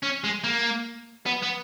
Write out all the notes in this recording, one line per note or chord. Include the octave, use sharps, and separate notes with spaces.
C#4
G#3
A#3
B3
B3